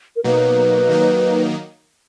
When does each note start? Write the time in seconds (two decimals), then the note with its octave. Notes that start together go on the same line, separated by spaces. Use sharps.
0.16 A#4
0.24 B2 F#3 A#3 D#4 B4
0.89 D#3 F#3 A#3 D#4